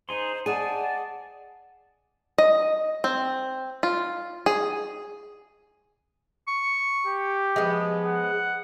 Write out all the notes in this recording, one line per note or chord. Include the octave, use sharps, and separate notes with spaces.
D#4 G#4 C5 C6
G#4 D5 D#5 F#5 G#5 A5
D#5
C4
F4
G#4
C#6
G4
F3 G#3 B3
F#5